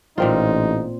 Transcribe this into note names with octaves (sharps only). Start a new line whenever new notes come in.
A1 A#2 C4 D#4 F4